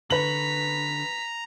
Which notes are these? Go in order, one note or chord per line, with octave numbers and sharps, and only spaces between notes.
D3 B4 C#5 A#5 B6 F#7